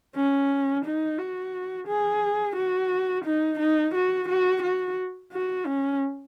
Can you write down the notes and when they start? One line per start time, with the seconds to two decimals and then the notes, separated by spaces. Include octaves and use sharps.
0.16 C#4
0.85 D#4
1.19 F#4
1.88 G#4
2.56 F#4
3.25 D#4
3.60 D#4
3.95 F#4
4.29 F#4
4.63 F#4
5.32 F#4
5.66 C#4